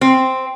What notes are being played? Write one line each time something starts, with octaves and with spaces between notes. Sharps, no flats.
C4